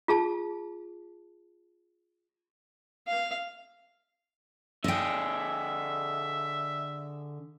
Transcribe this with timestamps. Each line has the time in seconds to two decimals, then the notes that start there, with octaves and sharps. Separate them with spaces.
0.08 F4 G#4 A5
3.08 F5
4.84 D3 G#4 D#5 E5 G5